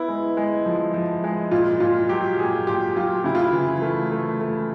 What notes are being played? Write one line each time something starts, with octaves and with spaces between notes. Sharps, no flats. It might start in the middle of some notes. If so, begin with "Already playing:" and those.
Already playing: B3 E4
G#3
G#3
F3
F3
G#3
A#2 F4
A#2 F4
F#3 G4
A#2 G#4
A#2 G4
F#3 F4
C#3 E4
F4
E4
E3
A3
A3
A3